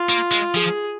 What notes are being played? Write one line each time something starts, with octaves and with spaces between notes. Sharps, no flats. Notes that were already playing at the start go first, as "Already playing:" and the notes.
Already playing: F4
A#3
G#3
F3 G#4